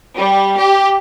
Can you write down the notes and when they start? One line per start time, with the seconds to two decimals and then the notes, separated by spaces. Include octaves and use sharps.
0.17 G3
0.58 G4